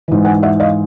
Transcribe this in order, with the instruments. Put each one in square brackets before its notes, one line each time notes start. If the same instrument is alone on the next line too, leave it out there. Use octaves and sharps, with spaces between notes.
[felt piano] G#2 E3
F#5 G#5
E5 F#5
D#5 F5